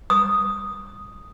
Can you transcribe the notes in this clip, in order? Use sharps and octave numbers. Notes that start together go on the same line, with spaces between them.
D#6